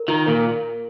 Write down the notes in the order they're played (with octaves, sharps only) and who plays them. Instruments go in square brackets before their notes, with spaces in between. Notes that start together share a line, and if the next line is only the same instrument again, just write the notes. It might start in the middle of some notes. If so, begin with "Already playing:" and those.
Already playing: [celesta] A#4
[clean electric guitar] D#3 [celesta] F4
[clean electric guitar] A#2 [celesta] A#4